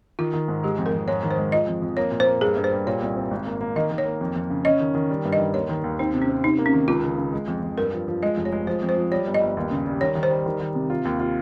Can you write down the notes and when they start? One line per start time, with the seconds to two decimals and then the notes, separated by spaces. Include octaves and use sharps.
0.19 D#3 F4
0.33 D#3
0.48 G#2
0.63 G#3 G4
0.78 F2
0.86 A#4
0.93 F2
1.08 G#2 C#5
1.23 D#3
1.31 C5
1.38 G#3
1.52 F3 D#5
1.67 F2
1.82 F2
1.97 A#3 C#5
2.12 A#2
2.20 C5
2.27 A#3
2.41 G2 G#4
2.57 G2
2.64 C5
2.71 G3
2.87 A#2 C#5
3.02 C2
3.17 C4
3.31 G#1
3.46 A#3
3.61 A#3
3.76 D#3 D#5
3.91 D#3
3.98 C#5
4.05 A#3
4.21 F2
4.36 F2
4.50 C#3
4.65 C#4 D#5
4.80 D#3
4.95 D#3
5.10 G3
5.25 G2
5.33 D#5
5.39 D#3
5.54 D#2 C#5
5.69 D#3
5.84 D#2
5.99 C4 D#4
6.14 C3
6.22 C#4
6.29 C4
6.44 C3 D#4
6.58 A#3
6.66 C#4
6.73 D#3
6.88 C#2 F4
7.04 C#3
7.18 C#3
7.33 G#3
7.48 F2
7.63 F2
7.77 G2 A#4
7.93 F3
8.08 F3
8.22 G#3 D#5
8.38 F1
8.45 C#5
8.52 G#3
8.67 F3 C5
8.82 F2
8.89 C5
8.97 F3
9.11 G3 C#5
9.27 G1
9.34 D#5
9.41 G1
9.57 D#2
9.71 C#3
9.87 G3
10.01 D#3 C#5
10.15 D#3
10.23 C5
10.30 G3
10.46 D#3
10.60 D#3
10.75 C3
10.90 F4
11.05 D#2
11.20 F4